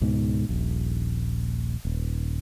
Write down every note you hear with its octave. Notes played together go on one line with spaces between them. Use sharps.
C#2 G#2 B2
D#1 A#1
D#1